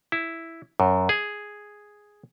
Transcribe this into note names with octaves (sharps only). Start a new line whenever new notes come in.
E4
F#2
G#4